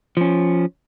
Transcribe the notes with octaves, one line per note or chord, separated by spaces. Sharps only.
F3 C#4